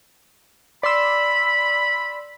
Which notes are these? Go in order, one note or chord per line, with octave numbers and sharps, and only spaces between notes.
D5 B5 C6 E6